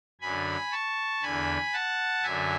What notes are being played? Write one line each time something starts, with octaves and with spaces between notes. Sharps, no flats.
F#2 D3 G#5 B5
A5 C#6
E2 D3 G#5 B5
F#5 A5
F#2 D3 E5 G#5